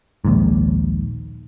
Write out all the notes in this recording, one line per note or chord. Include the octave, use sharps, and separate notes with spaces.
A#1 D#2 G#2